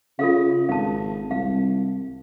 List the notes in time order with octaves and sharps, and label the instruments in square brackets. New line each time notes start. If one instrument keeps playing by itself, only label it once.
[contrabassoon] C#3 [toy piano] F4 A4 F5
[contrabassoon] G#1 [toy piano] F5 A5
[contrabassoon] C2 [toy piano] F5